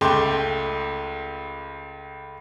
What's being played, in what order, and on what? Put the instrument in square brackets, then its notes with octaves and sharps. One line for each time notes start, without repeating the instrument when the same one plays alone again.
[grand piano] C#2 A3 G5 C6 D6